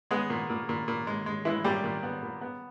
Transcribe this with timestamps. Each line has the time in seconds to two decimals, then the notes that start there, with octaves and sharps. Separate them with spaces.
0.11 G#3 B3 G#4
0.30 A#2
0.50 A#2
0.69 A#2
0.88 A#2
1.07 G#3
1.26 G#3
1.45 E3 G#3 E4
1.64 A#2 G3 G4
1.84 A#2
2.03 B3
2.23 A#2
2.41 B3